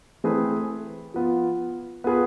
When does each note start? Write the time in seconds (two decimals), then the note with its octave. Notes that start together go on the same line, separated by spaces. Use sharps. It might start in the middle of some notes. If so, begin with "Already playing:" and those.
0.24 E3 A3 C4 G#4 B4
1.14 F3 B3 F4
2.04 B3 F4 G#4 B4